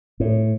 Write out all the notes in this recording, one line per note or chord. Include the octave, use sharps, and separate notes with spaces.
A2